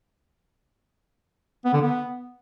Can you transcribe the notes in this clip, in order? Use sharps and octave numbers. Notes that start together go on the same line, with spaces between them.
B3
D3
B3